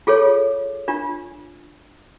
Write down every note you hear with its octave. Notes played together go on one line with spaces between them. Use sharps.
F4 G#4 A4 C#5
D4 F4